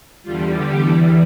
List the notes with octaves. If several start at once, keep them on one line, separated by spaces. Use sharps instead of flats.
E2 D3 G3 F4
G4
E2 E3 G3 A4